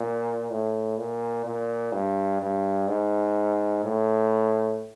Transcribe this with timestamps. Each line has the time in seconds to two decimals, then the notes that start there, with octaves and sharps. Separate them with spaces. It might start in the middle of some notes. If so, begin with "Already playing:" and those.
Already playing: A#2
0.50 A2
0.98 A#2
1.45 A#2
1.92 G2
2.41 G2
2.88 G#2
3.84 A2